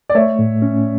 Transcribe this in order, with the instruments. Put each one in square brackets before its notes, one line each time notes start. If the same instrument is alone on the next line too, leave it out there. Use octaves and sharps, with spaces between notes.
[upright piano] D5
[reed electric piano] A3 [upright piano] C#5 E5
[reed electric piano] A2
C#4